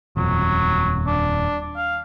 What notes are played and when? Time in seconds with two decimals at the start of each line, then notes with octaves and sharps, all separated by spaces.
0.17 D#1 F2 F#3
1.07 D4
1.76 F5